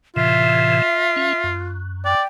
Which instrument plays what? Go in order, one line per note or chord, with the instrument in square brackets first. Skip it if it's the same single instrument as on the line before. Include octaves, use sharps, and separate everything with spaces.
[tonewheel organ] A2 C3 E3 [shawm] F4 [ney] E5
[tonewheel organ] C#4
F#2
[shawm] D5 [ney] G5